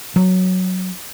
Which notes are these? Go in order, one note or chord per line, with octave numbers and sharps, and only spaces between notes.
F#3